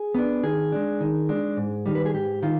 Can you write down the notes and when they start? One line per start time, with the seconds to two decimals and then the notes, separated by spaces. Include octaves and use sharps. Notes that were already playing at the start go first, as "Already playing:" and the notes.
Already playing: G#4
0.15 B3 D4
0.43 D#3 G#4
0.72 G#3 D4
1.00 D#3
1.29 G#3 D4
1.57 G#2
1.86 D#3 G3
1.95 B4
2.06 G#4
2.14 G#2 G4
2.43 D#3 F4